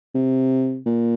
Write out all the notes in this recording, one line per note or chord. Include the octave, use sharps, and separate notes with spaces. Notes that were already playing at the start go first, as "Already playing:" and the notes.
C3
A#2